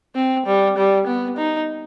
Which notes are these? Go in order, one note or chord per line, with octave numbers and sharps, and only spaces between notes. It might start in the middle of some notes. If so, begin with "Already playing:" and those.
C4
G3
G3
B3
D#4